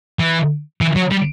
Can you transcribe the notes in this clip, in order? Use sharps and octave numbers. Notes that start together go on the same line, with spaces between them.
E3
E3
F#3
G3